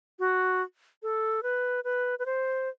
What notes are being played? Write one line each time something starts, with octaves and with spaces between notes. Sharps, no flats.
F#4
A4
B4
B4
B4
C5